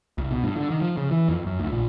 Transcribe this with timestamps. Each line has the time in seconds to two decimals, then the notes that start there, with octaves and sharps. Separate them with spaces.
0.18 C2
0.31 B2
0.43 G2
0.57 D3
0.70 D#3
0.82 F3
0.97 C#3
1.11 E3
1.28 F2
1.46 F#2
1.59 D2
1.72 A#1